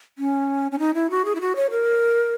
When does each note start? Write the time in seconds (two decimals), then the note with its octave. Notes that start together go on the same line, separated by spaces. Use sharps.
0.18 C#4
0.72 C#4
0.79 D#4
0.94 E4
1.11 F#4
1.25 G#4
1.35 E4
1.41 F#4
1.56 C#5
1.70 A#4